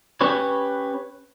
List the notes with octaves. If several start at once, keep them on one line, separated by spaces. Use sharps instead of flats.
C#4 G4 B4 C#5